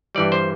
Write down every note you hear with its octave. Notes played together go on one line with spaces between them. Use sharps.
G2 E3 G3 D5
C5